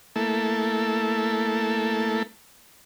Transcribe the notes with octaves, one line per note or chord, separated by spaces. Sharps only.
A3 A#3 E4 A4